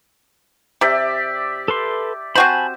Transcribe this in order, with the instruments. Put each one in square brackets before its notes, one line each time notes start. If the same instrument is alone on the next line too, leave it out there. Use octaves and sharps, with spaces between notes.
[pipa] C3 [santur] G4 D5 E5
[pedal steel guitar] A4 B4 C6
[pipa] C4 F#4 C5 [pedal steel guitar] G#5 A5 B5